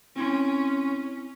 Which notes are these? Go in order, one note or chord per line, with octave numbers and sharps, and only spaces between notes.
C4 C#4 E4 C6